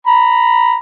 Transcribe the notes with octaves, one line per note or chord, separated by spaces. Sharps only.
A#5 B5